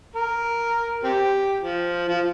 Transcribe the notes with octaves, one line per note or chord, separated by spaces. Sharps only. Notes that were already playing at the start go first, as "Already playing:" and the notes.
A#4
C4 G4
F3
F3